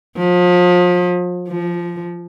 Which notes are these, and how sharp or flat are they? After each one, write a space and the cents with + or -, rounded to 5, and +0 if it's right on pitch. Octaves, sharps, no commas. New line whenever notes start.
F3 +35
F3 -10